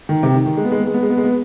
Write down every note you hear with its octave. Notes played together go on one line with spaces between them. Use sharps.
D#3
C3
D#3
D#3
G#3
B3
G#3
B3
G#3
B3
G#3
B3
G#3
B3